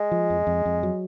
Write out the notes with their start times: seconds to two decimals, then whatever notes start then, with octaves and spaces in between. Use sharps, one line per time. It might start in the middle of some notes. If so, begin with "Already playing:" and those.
Already playing: G#3
0.11 F3
0.30 F2
0.47 F2
0.65 F2
0.83 F#3